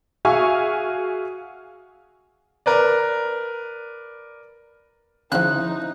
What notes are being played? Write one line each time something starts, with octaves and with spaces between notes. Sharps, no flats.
F#4 G#4 E5 F5 G#5 C#6
A#4 B4 D5
C#3 F3 C#4 D#4 E4 C5 F#6